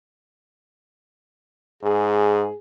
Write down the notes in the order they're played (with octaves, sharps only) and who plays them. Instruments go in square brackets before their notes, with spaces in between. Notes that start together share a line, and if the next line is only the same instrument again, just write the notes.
[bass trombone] G#2 [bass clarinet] G#4